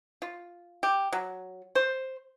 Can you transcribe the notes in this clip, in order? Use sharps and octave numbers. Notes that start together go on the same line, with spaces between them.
F4
G4
F#3
C5